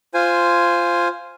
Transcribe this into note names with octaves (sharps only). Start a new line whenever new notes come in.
F4 C5 G#5